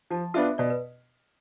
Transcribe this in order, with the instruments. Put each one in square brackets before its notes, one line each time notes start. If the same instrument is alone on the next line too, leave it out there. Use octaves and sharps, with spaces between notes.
[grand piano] F3 [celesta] A5
[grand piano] B3 D4 F4 [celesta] E5
[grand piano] B2 [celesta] D5
[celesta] B4